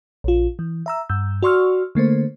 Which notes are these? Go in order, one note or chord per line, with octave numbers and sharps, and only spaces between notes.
A#1 F4
E3
E5 A#5 E6
G2 E6 G6
F#4 D5 C6 C#6 E6 F6
D3 A3 A#3 C5